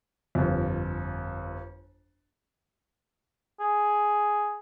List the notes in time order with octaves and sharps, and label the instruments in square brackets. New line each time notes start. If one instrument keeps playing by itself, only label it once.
[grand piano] G1 F2
[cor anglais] G#4